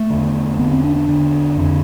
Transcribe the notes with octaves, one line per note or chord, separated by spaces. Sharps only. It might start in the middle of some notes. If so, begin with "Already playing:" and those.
Already playing: A3
E2 D3
E2 D3 B3
C4
D4
D4
E2 D3
F2 D3